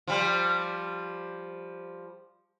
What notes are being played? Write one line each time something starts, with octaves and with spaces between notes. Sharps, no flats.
F3 G3